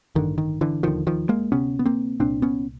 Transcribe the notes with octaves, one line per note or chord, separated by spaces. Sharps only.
A1 G2 D3 D#3
D#3
D3 E3
E1 D#2 D3 D#3 F3
D#3 F3
G#3 A#3
D2 C3 B3 C#4
B3
A#3 C4
C2 A#2 C4 D4
B3 C#4